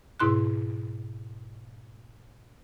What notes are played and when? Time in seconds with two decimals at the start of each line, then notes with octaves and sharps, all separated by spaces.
0.20 G#2 B2 E4 C6 F#6